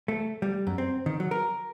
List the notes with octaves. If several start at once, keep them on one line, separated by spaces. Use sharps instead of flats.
A3
G3
F#2
C4
D#3
F#3
A#4